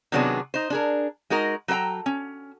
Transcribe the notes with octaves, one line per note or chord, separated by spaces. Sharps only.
C3 D#3 F#3 B3 D4 G#4
D#4 C5
D4 G#4 A#4
G#3 D#4 F#4 A#4
F#3 A4 A#4 G5 A#5
C#4